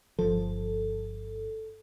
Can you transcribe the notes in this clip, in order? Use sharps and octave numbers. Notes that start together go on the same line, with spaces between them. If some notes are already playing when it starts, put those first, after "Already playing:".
G1 F3 A4